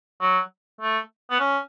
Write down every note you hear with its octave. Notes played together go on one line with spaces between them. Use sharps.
F#3
A3
B3
C#4